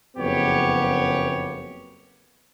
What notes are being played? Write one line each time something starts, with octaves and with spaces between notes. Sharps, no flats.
F#1 F2 B3 G4 C#5